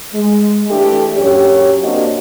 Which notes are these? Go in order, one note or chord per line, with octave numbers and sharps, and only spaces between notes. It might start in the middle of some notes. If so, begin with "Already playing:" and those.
G#3
E3 A3 D4 G4 A4
F#2 G4 C#5
A#3 C4 D4 F#4 G4 D#5